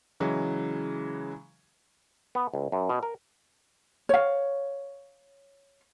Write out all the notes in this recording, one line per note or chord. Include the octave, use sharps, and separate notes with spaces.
C#3 E3 F#3 G#3
B3
C#2
F#2
B2
A#4
C#5 F5